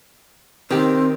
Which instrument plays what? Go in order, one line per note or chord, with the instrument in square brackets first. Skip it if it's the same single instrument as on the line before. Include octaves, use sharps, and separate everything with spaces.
[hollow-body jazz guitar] D#3 G4 [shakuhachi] C4